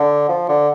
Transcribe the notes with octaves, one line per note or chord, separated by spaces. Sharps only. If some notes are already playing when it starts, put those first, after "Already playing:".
Already playing: D3
F3
D3